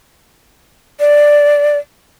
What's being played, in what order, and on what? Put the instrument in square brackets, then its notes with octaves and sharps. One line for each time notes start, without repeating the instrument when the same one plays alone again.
[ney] D5